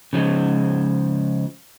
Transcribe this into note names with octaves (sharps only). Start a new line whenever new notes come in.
C#3 F3 F#3 G#3